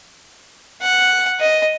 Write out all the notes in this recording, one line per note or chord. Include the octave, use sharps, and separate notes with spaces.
F#5
D#5